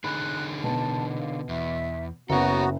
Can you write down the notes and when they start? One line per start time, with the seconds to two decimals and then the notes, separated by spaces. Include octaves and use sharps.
0.04 D3 D#4 G#4 B5 F#6
0.64 B2 A5
1.19 F5
1.49 E2 E5
2.30 F#1 B3 F#4 A4 C#5 A#5